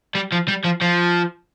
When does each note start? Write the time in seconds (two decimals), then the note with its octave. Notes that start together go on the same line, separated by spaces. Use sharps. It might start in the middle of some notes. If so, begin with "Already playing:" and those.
0.15 G3
0.32 F3
0.48 G3
0.64 F3
0.82 F3